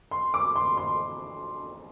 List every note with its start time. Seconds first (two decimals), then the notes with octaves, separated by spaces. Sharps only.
0.11 C6
0.34 D6
0.56 C6
0.77 C6